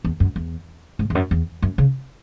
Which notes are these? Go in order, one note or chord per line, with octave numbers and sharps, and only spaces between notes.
E2
F#2
E2
G#2
E2
F#2
E2
F#2
C#3